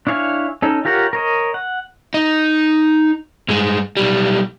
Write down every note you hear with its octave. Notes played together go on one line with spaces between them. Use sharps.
D4 E4 C#5 F5 G#5
C#4 D#4 A4
F4 G4 A#4 C#5 F#5
A#4 C#5 D#5
F#5
D#4
G2 G#3
B1 G3